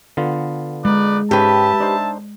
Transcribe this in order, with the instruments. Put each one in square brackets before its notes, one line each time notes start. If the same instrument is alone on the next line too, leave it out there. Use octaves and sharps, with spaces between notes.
[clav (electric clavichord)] D3 B3 F4
[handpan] G#3 [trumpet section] D#4 B4 D5
[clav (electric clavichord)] G#2 C#4 G#4 [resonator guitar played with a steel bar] G4 B4 [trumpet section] E5 A5
[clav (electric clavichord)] D4 D#4 C5